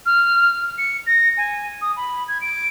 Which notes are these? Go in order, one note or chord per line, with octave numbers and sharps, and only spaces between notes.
F6
C#7
A#6
G#5
D#6
B5
G#6
D7